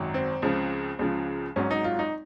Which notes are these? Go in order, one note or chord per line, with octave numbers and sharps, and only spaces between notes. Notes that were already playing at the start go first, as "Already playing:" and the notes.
Already playing: G#1 F#2 D#3 F#3
C4
C#2 C#3 F3
C#2 C#3 F3
G#1 G#2 F#3 C#4
D#4
F4
D#4